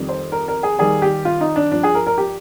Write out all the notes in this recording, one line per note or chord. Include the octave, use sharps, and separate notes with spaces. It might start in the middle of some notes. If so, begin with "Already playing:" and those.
Already playing: F2 D#3 G3
C5
A#4
A#4
G#4
D#2 D#3 G3 G#4
G4
F4
D#4
D4
G2 F3 D4
G#4
A#4
A#4
G4